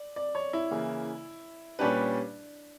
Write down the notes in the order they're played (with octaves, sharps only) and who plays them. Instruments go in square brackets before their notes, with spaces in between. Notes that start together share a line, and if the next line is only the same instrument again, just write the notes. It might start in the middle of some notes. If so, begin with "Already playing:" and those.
Already playing: [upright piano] D5
D5
C#5
E4
[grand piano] C#3 E3 A#3
[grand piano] A#2 G3 C#4 G4 B4 [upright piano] D4